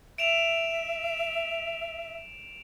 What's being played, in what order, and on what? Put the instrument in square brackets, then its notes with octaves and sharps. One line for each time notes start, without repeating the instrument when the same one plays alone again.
[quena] E5 [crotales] D7 E7 F7